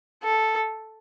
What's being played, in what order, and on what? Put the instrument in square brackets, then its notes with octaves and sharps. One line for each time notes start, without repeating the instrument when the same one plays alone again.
[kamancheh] A4